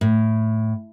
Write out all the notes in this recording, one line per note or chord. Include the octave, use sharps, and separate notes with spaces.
A2